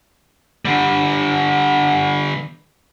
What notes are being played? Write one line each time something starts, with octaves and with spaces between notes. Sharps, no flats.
D3 G3